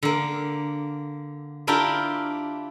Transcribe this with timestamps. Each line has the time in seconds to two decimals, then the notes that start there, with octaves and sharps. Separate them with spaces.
0.03 D3 A#3
1.67 A#3 D4 E4 F4 G4 A#4